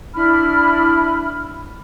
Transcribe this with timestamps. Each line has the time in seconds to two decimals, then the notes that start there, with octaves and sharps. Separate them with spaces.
0.14 D4 E4 B5 F6